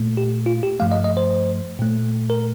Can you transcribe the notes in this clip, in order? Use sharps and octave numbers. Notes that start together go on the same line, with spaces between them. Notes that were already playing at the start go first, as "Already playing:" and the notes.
Already playing: A#2 A3
G4
F4
G4
G2 F3 A3 F5
D#5
D#5
C5
A#2 A3
A#4